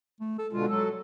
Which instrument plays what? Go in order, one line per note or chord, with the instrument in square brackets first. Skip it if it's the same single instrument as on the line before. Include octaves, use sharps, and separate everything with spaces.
[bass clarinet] A3
A4
[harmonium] B2 D3 F4 [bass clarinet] G#3
[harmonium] F#3 A4